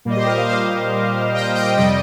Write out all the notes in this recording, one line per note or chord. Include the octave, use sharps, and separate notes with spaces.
A#2 G3 A#3
D#5
G4 C5
A#4 D#5
C5 F5
C5 F5
D#5 G5
D#5 G5
F2 C3 G3 D#5 G5